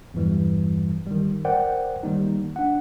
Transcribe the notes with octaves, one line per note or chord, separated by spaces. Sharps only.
E2 G2 E3 G3
D#3 G3
A#4 C5 D5 F#5 G5
D#3 G3 A#3 D#4
D4 F#5